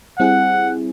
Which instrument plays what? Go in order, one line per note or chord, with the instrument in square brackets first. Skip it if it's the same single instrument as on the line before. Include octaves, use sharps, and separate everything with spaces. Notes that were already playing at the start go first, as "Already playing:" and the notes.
[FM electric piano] G3 C4 E4 G#4 [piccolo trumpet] F#5